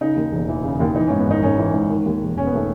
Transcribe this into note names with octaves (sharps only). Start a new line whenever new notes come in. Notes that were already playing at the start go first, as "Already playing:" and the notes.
C#3 D#4
D#2
E1
E3
C#3
D#2
E3 D#4
C#4
G#2
B3
G#1 D#4
G#1 C#4
E3
G#2
D#3
D#2
E1
E1 C#4
B3
D#3 A3